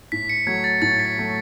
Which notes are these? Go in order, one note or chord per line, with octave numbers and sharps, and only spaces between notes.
A2 B6
C#7
F#3 A3 G#6
A6
A2 A6
B6
A6
F#3 A3